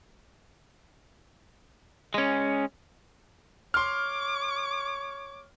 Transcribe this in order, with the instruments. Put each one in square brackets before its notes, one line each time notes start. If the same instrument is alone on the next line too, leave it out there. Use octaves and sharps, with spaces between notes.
[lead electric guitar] G#3 C#4
[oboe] C#5 [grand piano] C6 F6 [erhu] D6